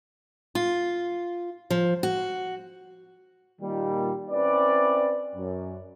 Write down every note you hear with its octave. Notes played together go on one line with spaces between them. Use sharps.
F4
F3
F#4
A#2 D#3 G3
C4 C#4 E4 B4 D5
F#2